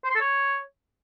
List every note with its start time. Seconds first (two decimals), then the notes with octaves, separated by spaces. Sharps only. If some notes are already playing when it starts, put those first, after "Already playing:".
0.04 C5
0.10 C6
0.15 A4
0.21 C#5